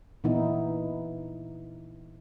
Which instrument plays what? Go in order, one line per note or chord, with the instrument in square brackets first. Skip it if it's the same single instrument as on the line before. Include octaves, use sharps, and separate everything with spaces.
[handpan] A#2 E3 B3 D#4 E4